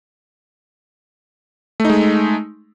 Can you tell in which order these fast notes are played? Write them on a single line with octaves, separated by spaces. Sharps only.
A3 D#4 G#3